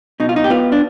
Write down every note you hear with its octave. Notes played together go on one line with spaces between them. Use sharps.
B2 D#4
F4
D#4
G4
B3 F4
D4